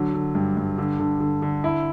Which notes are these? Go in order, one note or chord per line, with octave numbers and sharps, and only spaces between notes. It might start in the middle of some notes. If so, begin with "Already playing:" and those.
Already playing: D3 F#3
D3
G2
G2
D3
D3
D3
D3
E4